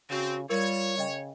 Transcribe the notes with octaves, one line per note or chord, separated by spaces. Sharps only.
C#3 C4 F#4
G3 F4 A#4 C#5
C#3 D#5 G5